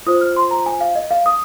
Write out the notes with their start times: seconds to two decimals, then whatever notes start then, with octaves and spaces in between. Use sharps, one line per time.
0.06 F4 C5 D#6
0.21 F6
0.36 C6
0.51 A#5
0.66 G#5
0.81 F5
0.95 D#5
1.11 F5
1.26 D#6